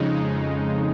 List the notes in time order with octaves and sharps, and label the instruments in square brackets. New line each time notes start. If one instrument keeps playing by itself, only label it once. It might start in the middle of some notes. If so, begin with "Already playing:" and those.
Already playing: [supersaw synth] F2 C#3 G#3 D#4